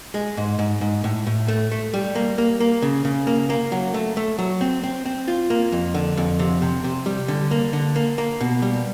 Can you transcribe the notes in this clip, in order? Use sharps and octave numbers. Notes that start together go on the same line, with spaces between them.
G#3
G#2
G#2
G#2
A2
A2
A3
A3
G3
A#3
A#3
A#3
C#3
C#3
A#3
A#3
F#3
A3
A3
F#3
C4
C4
C4
F4
A#3
F2
D3
F2
C3
C3
C3
G3
D3
A#3
D3
A#3
A#3
B2
G3